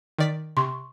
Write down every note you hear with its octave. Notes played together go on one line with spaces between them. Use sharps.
D#3 D5 B6
C3 C6 C#6